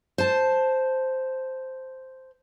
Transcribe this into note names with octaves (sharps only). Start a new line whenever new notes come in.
C5 A5